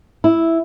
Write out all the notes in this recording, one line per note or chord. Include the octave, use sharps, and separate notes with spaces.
E4